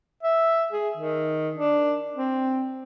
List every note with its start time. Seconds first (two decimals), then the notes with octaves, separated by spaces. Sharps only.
0.23 E5
0.73 G#4
0.97 D#3
1.56 D4
2.16 C4